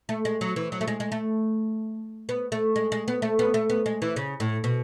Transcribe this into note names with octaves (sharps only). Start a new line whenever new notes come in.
A3
G#3
F#3
E3
F#3
A3
G#3
G#3
A3
B3
A3
G#3
G#3
B3
A3
B3
A3
B3
G#3
E3
C#3
A2
B2